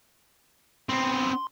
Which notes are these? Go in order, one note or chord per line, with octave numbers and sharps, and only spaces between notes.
B3 C4 C6